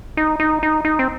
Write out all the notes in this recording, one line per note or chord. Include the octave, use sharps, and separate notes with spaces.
D#4
D#4
D#4
D#4
C4